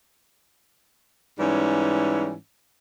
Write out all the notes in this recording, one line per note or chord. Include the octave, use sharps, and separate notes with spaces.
G#2 E3 G3 C#4